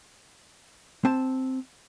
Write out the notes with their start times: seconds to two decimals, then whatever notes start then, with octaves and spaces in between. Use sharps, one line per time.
1.05 C4 A5